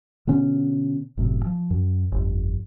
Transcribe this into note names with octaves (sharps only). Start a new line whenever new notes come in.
B2 D3 B3 C#4
F#1 A2 C3
F3
F#2
G1 F2